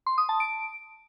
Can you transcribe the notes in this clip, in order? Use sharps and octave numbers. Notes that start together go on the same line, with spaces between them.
C6
D#6
A5
D7